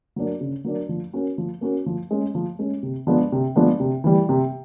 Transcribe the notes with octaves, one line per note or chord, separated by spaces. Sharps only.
F#3 A#3 D4
C#3
F#3 A#3 D4
F3
A#3 C#4 F#4
F3
A#3 C#4 F#4
F3
G#3 C#4
F3
G#3 C#4
C3
F3 G#3 B3 D4
C3
F3 G#3 B3 D4
C3
E3 G3
C3